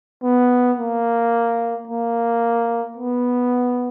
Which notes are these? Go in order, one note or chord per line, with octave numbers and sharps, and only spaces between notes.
B3
A#3
A#3
B3